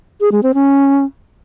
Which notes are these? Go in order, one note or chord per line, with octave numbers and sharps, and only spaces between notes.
G#4
G#3
C4
C#4